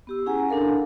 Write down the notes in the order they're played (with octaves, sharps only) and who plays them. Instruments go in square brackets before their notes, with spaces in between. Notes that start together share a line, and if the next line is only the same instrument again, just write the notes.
[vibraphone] B3 G4 E6
C#4 E4 G#4 F#5 G#5 A#5
D4 A4 A#4 F5